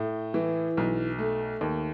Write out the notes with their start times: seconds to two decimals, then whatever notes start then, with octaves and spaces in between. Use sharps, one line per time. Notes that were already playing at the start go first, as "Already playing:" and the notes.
Already playing: A2
0.34 E3
0.77 B1
1.19 A3
1.61 D#2